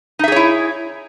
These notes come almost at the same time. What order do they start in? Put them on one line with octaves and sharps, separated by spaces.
D#4 E5 G#4 C#5 E4